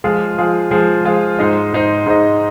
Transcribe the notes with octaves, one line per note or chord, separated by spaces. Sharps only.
F3 G#3 F4 G#4
F3 G#3 F4 G#4
F3 G#3 F4 G#4
F3 G#3 F4 G#4
G#2 G#3 D#4 C5 D#5
G#2 G#3 D#4 C5 D#5
G#2 G#3 D#4 C5 D#5